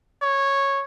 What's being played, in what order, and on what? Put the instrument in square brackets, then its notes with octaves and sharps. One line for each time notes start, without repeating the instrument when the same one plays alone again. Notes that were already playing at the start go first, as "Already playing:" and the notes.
[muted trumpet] C#5